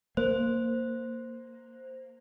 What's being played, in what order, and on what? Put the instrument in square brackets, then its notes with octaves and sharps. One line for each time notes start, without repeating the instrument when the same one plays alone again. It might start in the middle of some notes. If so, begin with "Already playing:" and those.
[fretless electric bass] A#3 [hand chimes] C5